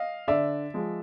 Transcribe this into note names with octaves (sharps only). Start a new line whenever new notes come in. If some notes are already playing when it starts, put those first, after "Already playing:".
Already playing: D#5 F5
D3 D5 E5
F3 G#3